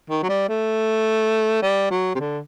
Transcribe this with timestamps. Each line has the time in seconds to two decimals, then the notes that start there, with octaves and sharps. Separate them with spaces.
0.10 D#3
0.23 F#3
0.29 G3
0.49 A3
1.63 G3
1.91 F#3
2.15 C3
2.20 D3